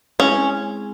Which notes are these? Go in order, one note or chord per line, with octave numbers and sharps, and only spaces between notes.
G#3 C4 C#4 E4 G#4